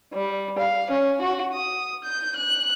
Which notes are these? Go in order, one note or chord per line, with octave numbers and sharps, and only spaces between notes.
G3
F5
C#4
F#4
D#6
G6
F#6